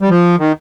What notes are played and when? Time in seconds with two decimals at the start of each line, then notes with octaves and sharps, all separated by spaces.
0.02 G3
0.09 F3
0.39 D#3